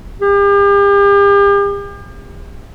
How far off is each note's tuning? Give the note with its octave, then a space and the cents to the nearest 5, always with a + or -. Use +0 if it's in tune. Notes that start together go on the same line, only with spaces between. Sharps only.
G4 +40